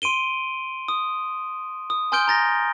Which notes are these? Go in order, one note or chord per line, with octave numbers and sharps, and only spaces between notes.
C6 D7 D#7 G7
D#6
D#6
G#5 C6 F6 G6 D7 G7
A#5 A6 A#6